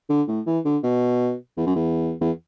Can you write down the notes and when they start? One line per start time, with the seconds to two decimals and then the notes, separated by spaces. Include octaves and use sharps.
0.09 D3
0.28 A2
0.46 E3
0.65 D3
0.83 B2
1.57 E2
1.67 F#2
1.75 E2
2.21 E2